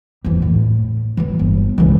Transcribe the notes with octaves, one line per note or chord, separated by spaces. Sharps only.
F2 E3
A2
E3 F#3
G1
C#2 E3